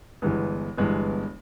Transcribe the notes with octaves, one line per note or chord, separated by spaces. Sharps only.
G1 G2 E3 G#3 B3
G1 G2 E3 G#3 B3